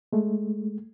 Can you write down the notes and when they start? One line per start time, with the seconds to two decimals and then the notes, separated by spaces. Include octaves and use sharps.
0.13 G#3 A3